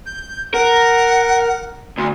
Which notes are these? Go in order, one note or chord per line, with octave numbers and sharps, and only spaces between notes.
G6
A#4 F#5
D2 C6